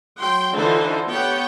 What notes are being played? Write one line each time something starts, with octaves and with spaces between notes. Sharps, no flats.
F#3 G5 C6
D3 E3 D#4 F4 C5
B3 G4 C#5 F#5 G5